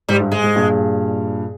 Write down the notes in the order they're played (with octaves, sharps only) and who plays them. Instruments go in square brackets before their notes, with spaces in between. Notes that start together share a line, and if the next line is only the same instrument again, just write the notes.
[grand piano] G#2 [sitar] G3
[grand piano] G2
[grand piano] G#2 [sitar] G#3
[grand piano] G#2
G2 A#2